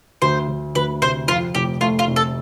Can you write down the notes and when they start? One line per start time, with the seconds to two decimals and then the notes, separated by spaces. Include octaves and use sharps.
0.22 D2 C5
0.48 D2
0.75 D2 B4
1.02 C3 C5
1.27 F2 F4
1.55 F1 G4
1.81 A3 F4
1.99 F4
2.08 F1
2.16 A4